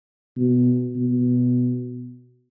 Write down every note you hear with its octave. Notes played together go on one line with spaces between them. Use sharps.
B2
B2